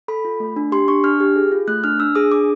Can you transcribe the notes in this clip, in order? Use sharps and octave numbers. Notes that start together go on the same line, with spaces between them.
A4 B5
F4
A3
D4
G4 C6
D4 C#6
D4 F6
G4
G#4
F4
A3 F#6
D4 F6
D4 E6
G#4 D#6
D4 D6